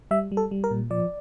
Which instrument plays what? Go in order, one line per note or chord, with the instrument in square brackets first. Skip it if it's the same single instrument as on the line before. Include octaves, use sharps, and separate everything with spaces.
[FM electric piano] G3 E5
G3
A4
G3
A#4
A#2
F3 D5